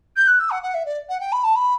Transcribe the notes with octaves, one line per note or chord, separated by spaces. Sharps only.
G6
F#6
E6
F#5
F#5
E5
D5
F#5
G5
B5
A5
B5